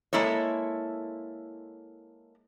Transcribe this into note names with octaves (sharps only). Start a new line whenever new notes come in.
G#3 A#3 E4 A4 C#5